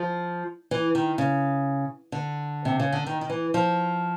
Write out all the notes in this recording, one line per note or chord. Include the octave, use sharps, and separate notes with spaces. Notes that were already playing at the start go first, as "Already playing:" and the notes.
Already playing: F3
E3
D#3
C#3
D3
C3
C#3
D3
D#3
D#3
E3
F3